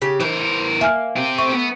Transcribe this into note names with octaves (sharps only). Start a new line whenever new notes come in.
C#3 G4
E3 A#4 C5
A#3 E5 G#5 F6
C4 G4
A3 C#6
B3